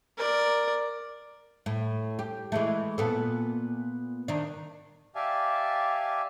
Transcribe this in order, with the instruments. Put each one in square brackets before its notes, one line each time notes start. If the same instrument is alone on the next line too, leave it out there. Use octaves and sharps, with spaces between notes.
[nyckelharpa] A#4 D5
[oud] A2
G4
E3 G#3 A3
A#2 B3 A4
D#3 D4
[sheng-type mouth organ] G4 D5 E5 F5 G#5 A5